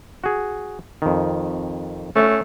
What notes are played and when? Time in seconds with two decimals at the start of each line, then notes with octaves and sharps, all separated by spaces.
0.24 F#4 G#4
1.02 F2 D#3
2.16 A3 C#4 C#5